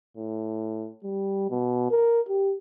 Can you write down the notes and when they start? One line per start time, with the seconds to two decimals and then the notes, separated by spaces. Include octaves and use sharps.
0.17 A2
1.04 G3
1.50 B2
1.91 A#4
2.29 G4